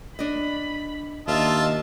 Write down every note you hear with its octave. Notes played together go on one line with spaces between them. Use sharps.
D4 D#5 B5
D#2 D4 F4 D#5 E5 A5